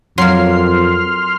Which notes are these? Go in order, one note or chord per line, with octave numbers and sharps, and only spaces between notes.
F2 F#3 A#3 C6 F6 C7